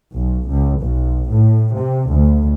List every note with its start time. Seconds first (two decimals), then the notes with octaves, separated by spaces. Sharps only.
0.14 B1
0.49 C#2
0.81 B1
1.30 A2
1.77 C3
2.10 D2